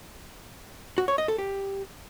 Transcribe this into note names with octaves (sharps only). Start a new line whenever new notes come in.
F#4
C#5
D#5
A4
G4